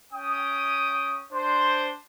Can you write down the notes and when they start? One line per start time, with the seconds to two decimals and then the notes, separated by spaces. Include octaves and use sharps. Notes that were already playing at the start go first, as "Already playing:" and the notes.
0.13 C#4 G5 D#6
1.32 D4 C5